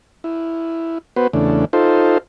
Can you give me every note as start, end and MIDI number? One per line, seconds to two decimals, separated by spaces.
0.24 0.98 64
1.16 1.27 59
1.16 1.27 66
1.16 1.27 71
1.16 1.27 72
1.33 1.65 40
1.33 1.65 49
1.33 1.65 57
1.33 1.65 62
1.73 2.18 63
1.73 2.18 65
1.73 2.18 69
1.73 2.18 72